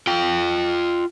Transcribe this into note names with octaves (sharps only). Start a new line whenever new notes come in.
F4 G5